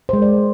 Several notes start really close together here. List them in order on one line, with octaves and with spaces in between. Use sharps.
C5 G#3 A#4 D5